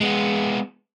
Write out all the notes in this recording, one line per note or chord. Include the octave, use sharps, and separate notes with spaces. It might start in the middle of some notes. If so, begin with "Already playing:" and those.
G#3 B3